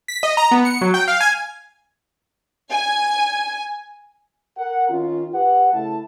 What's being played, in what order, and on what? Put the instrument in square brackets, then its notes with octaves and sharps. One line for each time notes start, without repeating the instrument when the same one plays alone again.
[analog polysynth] B6
D#5
A#5
B3
C#7
F#3
G5
F5
G#5
[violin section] G#5
[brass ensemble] A#4 F#5
D#3 C#4 F4
G4 B4 F#5
C#3 A3 E4 A5